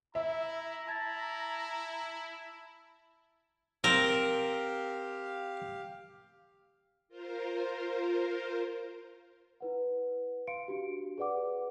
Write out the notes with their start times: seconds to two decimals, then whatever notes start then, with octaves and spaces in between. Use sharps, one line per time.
0.15 E4 E5 A#5
0.87 E4 A5 G#6 A6
3.84 C4 G4 A#4 F5
7.08 F4 A#4 C5
9.60 E4 B4 F#5
10.47 F5 C6 C#7 D7
10.68 D4 F#4 G4
11.18 G#4 B4 D5 F#5 D6